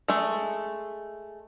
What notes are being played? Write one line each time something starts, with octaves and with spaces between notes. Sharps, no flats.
G#3 A3